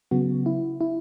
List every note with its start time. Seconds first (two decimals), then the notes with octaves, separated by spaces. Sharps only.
0.11 C#3 F#3 B3 F#4
0.46 E4
0.81 E4